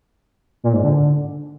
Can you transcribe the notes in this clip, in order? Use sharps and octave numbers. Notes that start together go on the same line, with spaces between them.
A#2
G#2
D3